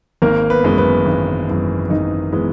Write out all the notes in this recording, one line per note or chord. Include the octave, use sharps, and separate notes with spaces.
G#1 A#3 A#4
B3 B4
F#2 E3 G#3 B3
B3 B4
G#1
F#2 E3 G#3 B3
G#1 D#4 D#5
E3 G#3 B3